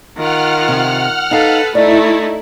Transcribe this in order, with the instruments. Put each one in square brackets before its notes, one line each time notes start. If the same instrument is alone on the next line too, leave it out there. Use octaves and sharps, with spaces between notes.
[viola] D#3 F4 [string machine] F#5 F6
[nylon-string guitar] C3
[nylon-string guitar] D#4 F5 [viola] A4 B4
[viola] A3 D#4 [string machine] E4 [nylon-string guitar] D5 D#5